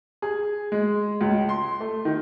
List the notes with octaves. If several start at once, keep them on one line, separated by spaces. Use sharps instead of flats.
G#4
G#3
C#2
C6
A3
D#3